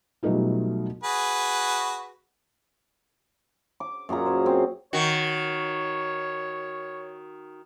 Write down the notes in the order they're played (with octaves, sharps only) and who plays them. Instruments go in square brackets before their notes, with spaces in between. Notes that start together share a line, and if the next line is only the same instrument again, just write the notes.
[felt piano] B2 F#3 G3 A3 D#4 F4
[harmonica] F#4 G#4 B4
[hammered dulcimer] D6
F#2 A#2 G#4 A#5
C#4 C5
C4
[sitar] D#3 F#4 [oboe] C#5